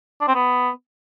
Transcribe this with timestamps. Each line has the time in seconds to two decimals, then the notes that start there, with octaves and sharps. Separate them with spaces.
0.21 D4
0.28 C4
0.35 B3